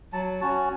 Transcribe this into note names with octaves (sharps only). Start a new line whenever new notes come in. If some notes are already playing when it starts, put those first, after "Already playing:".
F#3 A5
C#4 F#4 A5